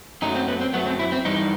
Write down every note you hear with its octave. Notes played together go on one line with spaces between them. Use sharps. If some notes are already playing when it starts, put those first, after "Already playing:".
F#2 F#3 A3 D#4
C4
B3
C4
F#2 F#3 A3 B3
C4
E4
C4
G2 E3 G3 D#4